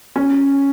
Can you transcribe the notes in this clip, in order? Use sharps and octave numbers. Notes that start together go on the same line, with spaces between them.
C#4